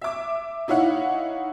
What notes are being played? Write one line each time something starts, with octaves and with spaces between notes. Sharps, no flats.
E5 D6
D#4 E4 C#5 F5 F#5